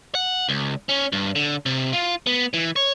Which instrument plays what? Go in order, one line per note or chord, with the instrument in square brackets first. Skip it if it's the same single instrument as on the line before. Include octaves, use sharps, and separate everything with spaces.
[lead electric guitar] F#5
C#2
C#4
G2
D3
C3
F4
B3
E3
C#5